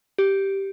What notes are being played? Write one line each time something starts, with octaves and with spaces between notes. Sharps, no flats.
G4